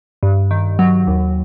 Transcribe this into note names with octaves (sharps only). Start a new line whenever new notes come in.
G2
D#3
F#3
D#2